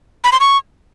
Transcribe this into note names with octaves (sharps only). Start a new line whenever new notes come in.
B5
C6
C#6